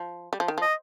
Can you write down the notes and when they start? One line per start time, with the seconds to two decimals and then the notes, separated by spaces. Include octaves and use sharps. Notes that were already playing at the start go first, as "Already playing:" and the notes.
Already playing: F3
0.33 G3
0.40 F3
0.48 D#3
0.58 F3
0.62 D#5